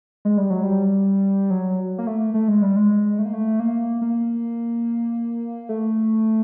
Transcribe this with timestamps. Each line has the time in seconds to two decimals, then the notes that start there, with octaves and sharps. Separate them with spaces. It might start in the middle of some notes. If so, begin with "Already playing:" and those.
0.25 G#3
0.37 G3
0.50 F#3
0.63 G3
1.50 F#3
1.98 A#3
2.07 A3
2.34 A3
2.48 G#3
2.62 G3
2.76 G#3
3.19 A3
3.26 A#3
3.33 A3
3.60 A#3
4.01 A#3
5.69 A3